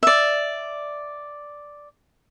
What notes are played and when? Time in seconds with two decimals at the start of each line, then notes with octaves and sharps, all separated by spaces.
0.03 D5 E5